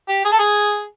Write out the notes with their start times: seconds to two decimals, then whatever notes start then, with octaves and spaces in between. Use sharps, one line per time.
0.09 G4
0.25 G#4
0.32 A4
0.39 G#4